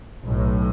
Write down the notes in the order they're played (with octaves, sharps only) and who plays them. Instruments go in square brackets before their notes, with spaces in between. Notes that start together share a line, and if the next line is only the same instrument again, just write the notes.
[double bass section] B1 A2